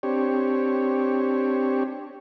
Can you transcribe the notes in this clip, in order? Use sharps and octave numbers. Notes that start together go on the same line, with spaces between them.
C4 D4 G4 C#5